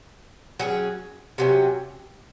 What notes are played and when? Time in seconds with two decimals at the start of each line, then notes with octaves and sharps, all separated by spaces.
0.60 F#3 C#4 G#4
1.38 C3 F#3 C#4